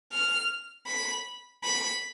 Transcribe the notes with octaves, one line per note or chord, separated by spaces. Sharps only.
F6
B5
B5